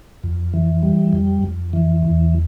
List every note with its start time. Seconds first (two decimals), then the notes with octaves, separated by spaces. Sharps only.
0.24 F2
0.54 E3
0.83 G3
1.13 F2
1.43 F2
1.73 E3
2.03 E2